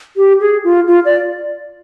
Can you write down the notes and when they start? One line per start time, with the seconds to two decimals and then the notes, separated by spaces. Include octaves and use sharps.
0.17 G4
0.40 G#4
0.64 F4
0.88 F4
1.05 D5